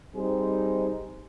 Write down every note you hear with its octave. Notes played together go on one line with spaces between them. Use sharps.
G3 C4 D#4 G#4 C5